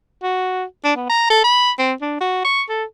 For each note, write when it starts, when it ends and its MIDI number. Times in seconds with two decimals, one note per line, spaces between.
0.23 0.64 66
0.85 0.94 62
0.96 1.08 59
1.09 1.29 82
1.30 1.42 69
1.44 1.71 83
1.79 1.93 60
2.02 2.20 62
2.20 2.41 66
2.45 2.63 85
2.69 2.84 69